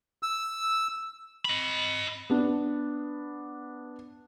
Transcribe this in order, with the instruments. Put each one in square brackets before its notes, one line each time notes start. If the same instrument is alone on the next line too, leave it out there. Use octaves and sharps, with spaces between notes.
[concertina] E6
[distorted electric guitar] D#5 B5
[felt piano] B3 D4